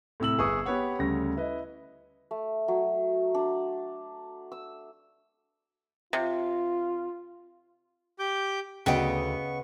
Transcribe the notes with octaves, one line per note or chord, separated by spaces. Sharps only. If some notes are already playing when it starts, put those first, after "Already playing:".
A2 C3 E6 F#7
G1 G#4 B4 C#6 D#6 E6
B3 G4 B4 C#5 F#5
D2 C#3 G3 A#6
E4 B4 D#5
A3
F#3
D4
E6
C3 F4
G4 D6 G6
D2 C#3 B3 D#5 G5 C#6